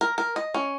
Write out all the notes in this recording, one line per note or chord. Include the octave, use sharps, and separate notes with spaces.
A#4
A#4
D#5
C#4